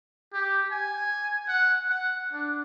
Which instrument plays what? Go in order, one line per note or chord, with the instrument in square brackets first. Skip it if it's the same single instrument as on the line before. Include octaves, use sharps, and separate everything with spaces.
[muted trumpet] G4
G#5
F#5
F#5
D4